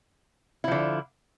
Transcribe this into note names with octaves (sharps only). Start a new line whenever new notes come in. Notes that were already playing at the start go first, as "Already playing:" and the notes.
D3 F3 E4